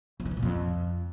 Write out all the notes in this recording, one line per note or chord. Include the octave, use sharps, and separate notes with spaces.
F2
D#3
E3
A#2
F2